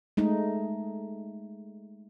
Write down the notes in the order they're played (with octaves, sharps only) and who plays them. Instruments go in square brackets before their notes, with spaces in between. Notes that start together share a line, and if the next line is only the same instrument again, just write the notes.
[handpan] G#3 A3 D#4